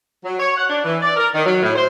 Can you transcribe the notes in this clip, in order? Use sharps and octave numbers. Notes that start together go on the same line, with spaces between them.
F#3
C#5
F#5
D4
E3
D5
A#4
D#3
F#3
A2
C5